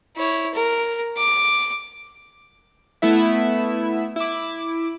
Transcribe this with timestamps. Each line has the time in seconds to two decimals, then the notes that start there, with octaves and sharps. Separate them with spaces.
0.16 E4 C#5
0.54 A#4
1.17 D6
3.02 A3 B3 E4 E5
4.16 E4 D6